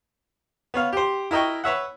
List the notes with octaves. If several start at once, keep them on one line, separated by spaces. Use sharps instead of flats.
B3 C#5 F5
G4 C5
E4 A#4 D#5 G5 C#6
B4 C#5 E5 F#5